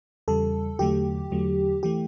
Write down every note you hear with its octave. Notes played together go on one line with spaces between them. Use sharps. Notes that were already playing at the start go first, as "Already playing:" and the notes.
E2 C#3 G3 A4
E2 D3 F#3 A3 G4
E2 D3 F#3 A3
E3 A3 G4